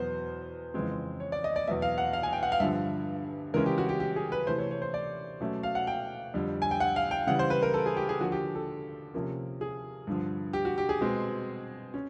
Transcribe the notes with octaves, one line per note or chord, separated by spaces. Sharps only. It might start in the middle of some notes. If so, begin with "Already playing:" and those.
Already playing: E2 B2 F#3 B3 C5
F2 C#3 E3 G#3 C4
C#5
D5
D#5
D5
E2 B2 F#3 B3 E5
F5
F#5
F5
G#5
G5
F#5
F5
G2 D3 F3 E5
C#3 E3 G#3 C#4 A#4
G4
F#4
G4
G4
G#4
B4
C3 E3 A3 C5
C#5
C#5
C5
D5
B2 F#3 A3 C#4
F5
F#5
G5
F2 D3 G3
G#5
G5
F#5
F5
G5
C#3 E3 G3 F#5
C5
B4
A#4
A4
G#4
G4
G#4
D3 F3 A#3 F#4
G4
A4
C3 F3 A#3 C#4
G#4
G2 D3 F3
G4
F#4
G4
G#4
B2 G#3 C4
C#4